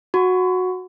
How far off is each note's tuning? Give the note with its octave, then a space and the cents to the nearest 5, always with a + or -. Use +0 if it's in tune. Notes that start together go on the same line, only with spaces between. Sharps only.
F#4 -10 C#6 +0